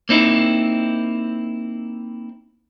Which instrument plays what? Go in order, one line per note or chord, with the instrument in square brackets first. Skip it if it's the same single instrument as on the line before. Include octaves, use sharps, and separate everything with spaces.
[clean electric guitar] A#3 C4 D#4 E4